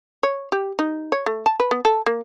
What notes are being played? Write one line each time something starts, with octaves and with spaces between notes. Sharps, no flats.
C#5
G4
D#4
C#5
A3
A5
B4
B3
A4
A#3